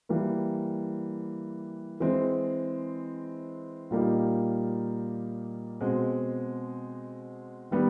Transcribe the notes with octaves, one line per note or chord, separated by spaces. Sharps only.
E3 G3 A#3
E3 G#3 C4
A#2 G3 A#3 D#4
B2 G#3 C4
D#3 G3 B3